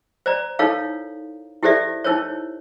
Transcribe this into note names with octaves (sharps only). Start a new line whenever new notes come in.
C5 D5 A#5
D#4 E4 A4 A#4 C#5 F5
E4 G4 A4 C5 D5 E5
D#4 E4 A#4 C5 C#5